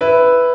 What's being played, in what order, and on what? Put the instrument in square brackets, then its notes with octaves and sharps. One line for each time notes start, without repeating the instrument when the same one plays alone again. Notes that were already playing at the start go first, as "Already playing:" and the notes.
[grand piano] E4 B4